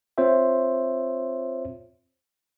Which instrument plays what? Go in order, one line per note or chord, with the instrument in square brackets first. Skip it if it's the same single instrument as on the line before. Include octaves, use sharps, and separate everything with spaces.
[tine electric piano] C4 F4 C5 C#5 E5